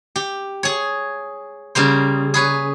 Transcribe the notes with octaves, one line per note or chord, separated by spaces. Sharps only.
G4
G#4 C#5
C#3 G3 A#3 C5
G#4 B4 C#5